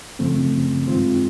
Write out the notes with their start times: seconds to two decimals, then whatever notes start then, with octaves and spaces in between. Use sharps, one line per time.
0.19 F#2 C#3 F3 A3 C4
0.87 G2 D#3 G#3 C4 F4